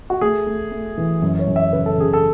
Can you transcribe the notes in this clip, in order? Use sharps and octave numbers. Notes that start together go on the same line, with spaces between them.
F#4
A3 G#4
A3
A3
E3
F#2
C#5
F#2
E5
C#3 B4
A4
C#3 G#4
A4